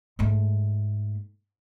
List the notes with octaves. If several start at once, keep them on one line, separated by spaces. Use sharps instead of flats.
G#2 A3